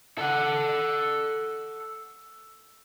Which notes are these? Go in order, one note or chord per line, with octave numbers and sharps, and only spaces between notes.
A4 F#5